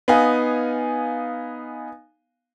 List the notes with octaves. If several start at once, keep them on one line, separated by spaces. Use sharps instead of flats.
B3 D#4 F5 G#5